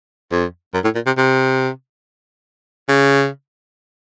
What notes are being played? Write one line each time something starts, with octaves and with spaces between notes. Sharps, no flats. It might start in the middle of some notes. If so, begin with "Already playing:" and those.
F2
F#2
A2
A#2
C3
C3
C#3